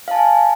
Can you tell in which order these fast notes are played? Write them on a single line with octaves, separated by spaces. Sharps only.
F5 A5 G#5